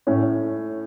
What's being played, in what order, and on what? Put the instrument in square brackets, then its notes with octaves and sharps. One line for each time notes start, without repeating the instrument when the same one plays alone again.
[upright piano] A2 C#4